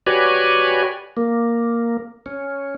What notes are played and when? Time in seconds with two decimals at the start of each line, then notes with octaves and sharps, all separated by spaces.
0.07 F#4 G4 B4 C#5 D5 G#5
1.17 A#3
2.26 C#4